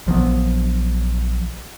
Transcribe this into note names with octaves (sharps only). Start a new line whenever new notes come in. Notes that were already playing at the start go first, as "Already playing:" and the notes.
A#1 F3 F#3 B3